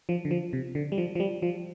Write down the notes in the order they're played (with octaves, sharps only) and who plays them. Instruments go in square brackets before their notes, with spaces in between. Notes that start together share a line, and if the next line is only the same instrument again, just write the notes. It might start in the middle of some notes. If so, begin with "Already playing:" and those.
[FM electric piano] F3
D3
F3
C3
D3
G3
F3
F3
G3
F3